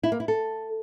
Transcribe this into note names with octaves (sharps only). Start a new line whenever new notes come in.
E4
A#3
E4
A4